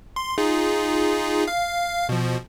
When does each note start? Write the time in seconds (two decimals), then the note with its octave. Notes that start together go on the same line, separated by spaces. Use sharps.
0.16 C6
0.38 D#4 F4 G#4
1.48 F5
2.09 B2 F3